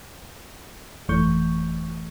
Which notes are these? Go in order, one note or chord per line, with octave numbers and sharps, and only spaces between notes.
G1 F2 E3 A3 C#6 G6